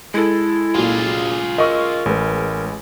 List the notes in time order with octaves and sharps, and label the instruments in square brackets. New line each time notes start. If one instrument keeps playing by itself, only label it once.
[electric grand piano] G#3 A4 [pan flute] E4
[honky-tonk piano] A#2 F#3 [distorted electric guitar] F4 G#4
[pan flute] A#4 [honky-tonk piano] D#5 C#6 E6
[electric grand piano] A1 [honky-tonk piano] G#3 B4